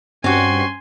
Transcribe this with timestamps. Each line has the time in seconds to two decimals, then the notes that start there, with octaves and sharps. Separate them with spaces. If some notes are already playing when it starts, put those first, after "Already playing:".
0.24 G2 C4 C#4 F#4 G#5 C6